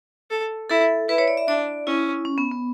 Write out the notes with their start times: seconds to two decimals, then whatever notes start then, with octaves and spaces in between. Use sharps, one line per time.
0.31 A4
0.70 E4 A4
1.09 E4 B4
1.18 C#5
1.28 D5
1.37 E5
1.48 D4 D5
1.86 C#4 E4
2.25 C#4
2.38 B3
2.51 B3